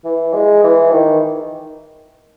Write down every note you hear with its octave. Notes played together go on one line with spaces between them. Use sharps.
E3
G#3
E3
D#3